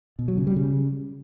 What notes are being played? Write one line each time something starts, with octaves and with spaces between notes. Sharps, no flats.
B2
F#3
C#3
G3
C#3